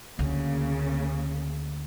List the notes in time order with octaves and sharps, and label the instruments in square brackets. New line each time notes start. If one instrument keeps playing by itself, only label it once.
[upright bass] D2 [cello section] C#3 A#3